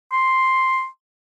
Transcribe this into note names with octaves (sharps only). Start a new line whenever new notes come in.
C6